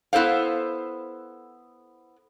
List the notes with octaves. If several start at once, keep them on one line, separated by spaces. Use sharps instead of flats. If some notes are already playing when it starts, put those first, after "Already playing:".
B3 E4 A4 C5 F5